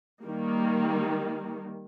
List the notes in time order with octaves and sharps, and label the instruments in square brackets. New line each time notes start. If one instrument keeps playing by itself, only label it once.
[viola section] D#3 G3 A#3